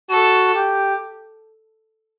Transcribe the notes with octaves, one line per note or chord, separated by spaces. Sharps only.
F#4 A4
G4